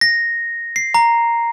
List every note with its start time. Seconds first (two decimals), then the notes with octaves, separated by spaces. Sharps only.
0.01 A#6
0.76 C7
0.94 A#5